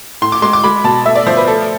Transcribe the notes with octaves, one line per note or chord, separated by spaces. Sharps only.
A2 C6
D6
G#3 C6
D6
G#3 B5
B2 A5
A3 E5
D5
F3 C5
B4
A3 A4